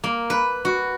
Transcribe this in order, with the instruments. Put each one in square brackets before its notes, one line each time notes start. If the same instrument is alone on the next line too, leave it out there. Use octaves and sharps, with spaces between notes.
[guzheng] A#3
B4
F#4